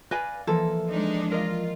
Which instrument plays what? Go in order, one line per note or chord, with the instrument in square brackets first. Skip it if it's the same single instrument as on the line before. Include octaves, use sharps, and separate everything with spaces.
[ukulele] B4 G#5 [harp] D5 F5 A#6
[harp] E3 F3 A#3 [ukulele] A4
[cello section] G#3 D4 D#4
[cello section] F4 [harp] A#4 D#5